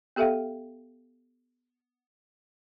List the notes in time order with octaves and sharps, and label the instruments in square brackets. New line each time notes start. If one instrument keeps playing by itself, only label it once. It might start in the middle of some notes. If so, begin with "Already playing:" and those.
[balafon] B3 G4 A4 E5 F5 G5